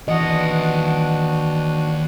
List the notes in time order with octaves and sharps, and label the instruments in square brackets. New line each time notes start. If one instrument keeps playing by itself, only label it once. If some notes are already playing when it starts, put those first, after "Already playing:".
[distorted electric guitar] D#2 F#5 [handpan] E3 D#5 [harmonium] D4 F#4